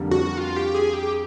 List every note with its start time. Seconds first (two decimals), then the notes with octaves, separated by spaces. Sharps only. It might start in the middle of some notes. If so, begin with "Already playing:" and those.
Already playing: F2 D3 G3 A#3
0.11 F#4
0.37 F4
0.56 G4
0.74 G#4
0.93 G4